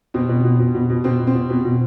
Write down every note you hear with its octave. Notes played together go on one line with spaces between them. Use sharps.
B2 C4
B2
B2
B2
B2
B2
B2 C4
B2
C4
B2
B2
B2